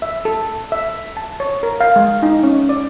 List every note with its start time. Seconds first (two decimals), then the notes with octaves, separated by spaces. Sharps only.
0.02 E5
0.25 A4
0.72 E5
1.17 A5
1.40 C#5
1.63 A#4
1.80 F5
1.96 G#3
2.23 D#4
2.43 C#4
2.69 D5